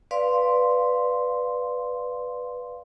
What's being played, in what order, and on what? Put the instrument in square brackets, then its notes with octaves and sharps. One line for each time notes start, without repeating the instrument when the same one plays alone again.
[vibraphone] B4 D5 F5 C6